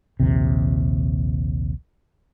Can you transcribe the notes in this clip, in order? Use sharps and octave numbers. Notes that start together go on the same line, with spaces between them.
A#1 D#2 C3